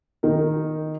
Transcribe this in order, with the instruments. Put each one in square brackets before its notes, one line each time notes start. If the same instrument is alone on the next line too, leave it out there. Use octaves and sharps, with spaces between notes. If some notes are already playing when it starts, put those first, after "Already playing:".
[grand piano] D#3 D#4 A#4